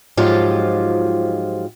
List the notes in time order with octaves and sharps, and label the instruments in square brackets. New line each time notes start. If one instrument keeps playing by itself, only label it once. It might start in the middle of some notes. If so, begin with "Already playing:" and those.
[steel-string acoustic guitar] G#2 F3 F#3 F4 G4